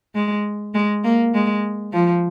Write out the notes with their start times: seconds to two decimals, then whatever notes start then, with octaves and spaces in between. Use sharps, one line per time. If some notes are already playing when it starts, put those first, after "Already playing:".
0.15 G#3
0.74 G#3
1.04 A#3
1.34 G#3
1.92 F3